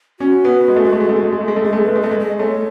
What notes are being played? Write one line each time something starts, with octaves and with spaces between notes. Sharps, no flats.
C#4 F#4
B3
G#3
A3
G#3
A3
G#3
A3
G#3
A3
G#3
A3
G#3
A3
G#3 G#4
A3
G#3
A3 B4
G#3
A3 D#5
G#3
D#5
A3 C#5